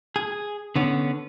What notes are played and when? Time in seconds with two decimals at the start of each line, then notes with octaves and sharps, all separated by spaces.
0.16 G#4
0.76 D3 B3 C#4